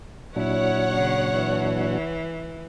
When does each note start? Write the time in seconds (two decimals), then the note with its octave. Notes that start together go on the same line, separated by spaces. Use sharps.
0.36 A#2 F#3 D4 E4 C#5 F#5
0.95 C#3
1.33 E3